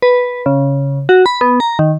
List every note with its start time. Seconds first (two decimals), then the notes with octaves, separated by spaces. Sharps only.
0.02 B4
0.46 C#3
1.09 F#4
1.26 B5
1.41 B3
1.60 A#5
1.79 D#3